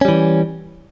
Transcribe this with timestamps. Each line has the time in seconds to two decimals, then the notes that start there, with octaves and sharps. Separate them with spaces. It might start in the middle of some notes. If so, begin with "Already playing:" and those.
0.01 C#4
0.05 G3
0.08 E3